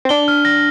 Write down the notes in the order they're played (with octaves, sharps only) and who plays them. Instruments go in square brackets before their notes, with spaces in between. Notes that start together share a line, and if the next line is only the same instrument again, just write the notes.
[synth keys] C4
[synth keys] D4 [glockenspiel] G7
[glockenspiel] F6
A#6